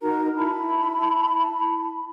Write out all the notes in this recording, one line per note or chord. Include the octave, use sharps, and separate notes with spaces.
D#4 F#4 A#4 A#5
E4 A5 B5